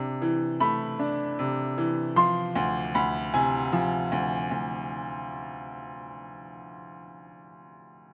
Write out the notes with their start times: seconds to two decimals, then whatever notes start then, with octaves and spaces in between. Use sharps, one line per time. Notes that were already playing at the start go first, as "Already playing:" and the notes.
Already playing: C3 D4
0.22 E3
0.60 A3 B5
0.99 D4
1.39 C3
1.78 E3
2.16 F3 C6
2.55 D2
2.94 D2 B5
3.34 C3 G#5
3.72 F3
4.12 D2
4.51 D2